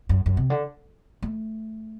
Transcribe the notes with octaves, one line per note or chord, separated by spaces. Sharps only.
F#2
F#2
C3
D3
A3